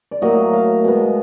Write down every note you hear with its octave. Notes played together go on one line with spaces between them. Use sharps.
D5
A2 F#3 A#3 D#5
F5
B2 G#3 B3